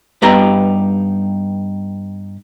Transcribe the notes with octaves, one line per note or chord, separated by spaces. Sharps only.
G2 B3 D#4 G4 A#5